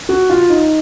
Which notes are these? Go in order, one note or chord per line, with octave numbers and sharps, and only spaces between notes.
F#4
F4
D#4